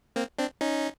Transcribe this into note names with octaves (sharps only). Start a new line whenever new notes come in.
A#3 C4
C4 D4
C#4 D#4